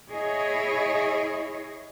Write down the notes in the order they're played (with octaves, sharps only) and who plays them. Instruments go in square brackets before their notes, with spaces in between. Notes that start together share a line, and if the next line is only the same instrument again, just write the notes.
[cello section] E4 G#4 C#5 D#5